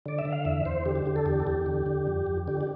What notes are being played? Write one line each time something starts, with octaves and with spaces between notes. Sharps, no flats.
D3 D5
E5
D3
F5
E2 E5
E2 C5
D3 G4
G4
D3 G4
A4
E2 G4
A4
E2 G4
D3
D3
F2
F2
D3 G4
G4